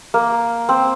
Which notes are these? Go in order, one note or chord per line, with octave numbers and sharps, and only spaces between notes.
A#3
C4